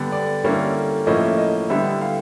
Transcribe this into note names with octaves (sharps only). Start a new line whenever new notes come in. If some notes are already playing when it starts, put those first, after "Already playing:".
Already playing: D3 G3 B3 D4 D5
D5
D3 G3 A#3 C#4 E4
A2 F3 A#3 C#4 E4 D#5
E5
D#5
D3 G3 B3 E4 E5
F5